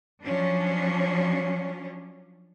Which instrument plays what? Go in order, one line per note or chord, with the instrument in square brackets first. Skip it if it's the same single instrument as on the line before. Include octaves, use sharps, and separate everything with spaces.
[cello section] F3 F#3 C#4 D4